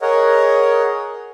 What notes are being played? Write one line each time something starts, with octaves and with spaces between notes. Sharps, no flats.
G#4 A#4 C#5 D#5 F#5